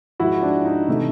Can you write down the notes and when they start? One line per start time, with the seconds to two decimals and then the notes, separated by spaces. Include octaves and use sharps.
0.20 G#2 F3 G#3 E4 F#4
0.42 D4
0.65 D#4
0.88 C3 E3 A3